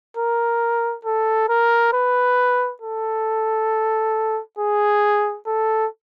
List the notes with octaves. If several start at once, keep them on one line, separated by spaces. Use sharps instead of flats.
A#4
A4
A#4
B4
A4
G#4
A4